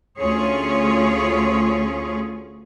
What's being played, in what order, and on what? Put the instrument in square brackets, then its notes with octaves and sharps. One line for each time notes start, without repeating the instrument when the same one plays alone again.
[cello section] D2 C#4 F4 G#4 C#5